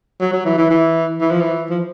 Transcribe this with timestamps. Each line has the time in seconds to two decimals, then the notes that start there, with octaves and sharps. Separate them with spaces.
0.21 F#3
0.33 F#3
0.46 E3
0.58 E3
0.71 E3
1.21 E3
1.31 F3
1.41 E3
1.70 F3